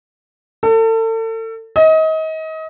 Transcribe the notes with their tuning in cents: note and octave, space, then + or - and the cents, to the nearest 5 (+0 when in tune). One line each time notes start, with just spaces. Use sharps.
A4 +35
D#5 +30